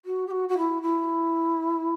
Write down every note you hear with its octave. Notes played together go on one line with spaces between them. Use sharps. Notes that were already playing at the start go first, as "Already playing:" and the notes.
F#4
G4
F#4
F#4
E4
E4